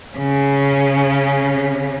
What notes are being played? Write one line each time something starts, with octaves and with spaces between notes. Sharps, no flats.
C#3 C#4